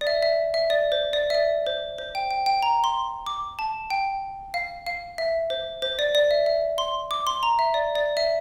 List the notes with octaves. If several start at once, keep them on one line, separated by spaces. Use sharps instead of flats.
D5
E5
E5
E5
D5
C5
D5
E5
D5
C5
C5
G5
G5
G5
A#5
C6
D6
A5
G5
F5
F5
E5
C5
C5
D5
D5
E5
E5
C6
D6
C6
A#5
E5
D5
D5
E5